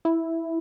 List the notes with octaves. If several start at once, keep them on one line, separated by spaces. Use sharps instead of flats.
E4